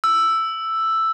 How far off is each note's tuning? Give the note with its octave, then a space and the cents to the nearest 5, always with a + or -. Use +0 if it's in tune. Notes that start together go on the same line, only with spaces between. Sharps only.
E6 +5